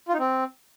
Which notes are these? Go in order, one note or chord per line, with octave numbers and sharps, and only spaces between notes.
F4
D#4
C4